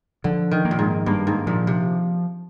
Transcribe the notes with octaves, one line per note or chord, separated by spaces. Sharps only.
D3 F3
D#3
A#3
A#2
G#2
G2 A#3
G#2
A#2 F3
C3